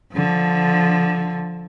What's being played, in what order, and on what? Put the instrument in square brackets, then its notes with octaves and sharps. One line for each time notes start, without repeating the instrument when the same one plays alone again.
[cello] D3 F3